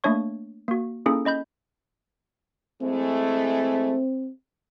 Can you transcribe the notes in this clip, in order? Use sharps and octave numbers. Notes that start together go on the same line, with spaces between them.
A3 A#3 D4 C#5 C#6
A#3 F#4
A#3 C#4 D#4 E4 G#4 A4
C#4 D#5 B5 G6
E3 G#3 A3 C4